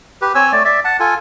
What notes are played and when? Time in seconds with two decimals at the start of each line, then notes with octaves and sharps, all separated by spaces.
0.21 G4 B4
0.35 C4 C#5 G#5 E6
0.52 A3 D5
0.65 D5 E5
0.84 F#5 A5
1.00 F4 A4 G#5